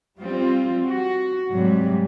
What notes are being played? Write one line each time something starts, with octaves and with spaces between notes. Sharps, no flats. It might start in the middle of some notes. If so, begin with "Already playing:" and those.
G3 C4 F4
F#4
G#2 C3 F#3 G3